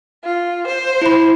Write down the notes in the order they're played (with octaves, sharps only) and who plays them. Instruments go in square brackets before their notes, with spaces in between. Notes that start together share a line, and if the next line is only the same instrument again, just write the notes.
[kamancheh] F4
C5
[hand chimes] E4 B5